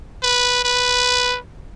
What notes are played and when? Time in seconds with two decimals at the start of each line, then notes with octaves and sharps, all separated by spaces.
0.23 B4
0.64 B4